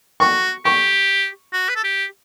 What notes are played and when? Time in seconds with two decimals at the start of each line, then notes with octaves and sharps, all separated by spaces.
0.20 F#4 C#6
0.65 G4 C#6
1.53 F#4
1.69 B4
1.76 A4
1.84 G4